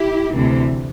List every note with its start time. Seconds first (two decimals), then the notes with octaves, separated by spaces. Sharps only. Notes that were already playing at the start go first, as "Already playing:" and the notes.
Already playing: E4 G4
0.34 D2 C3 E3